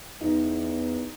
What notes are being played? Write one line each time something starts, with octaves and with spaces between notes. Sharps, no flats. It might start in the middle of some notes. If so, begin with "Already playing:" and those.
E2 D#4